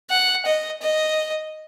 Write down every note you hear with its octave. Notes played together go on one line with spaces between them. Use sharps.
F#5
D#5
D#5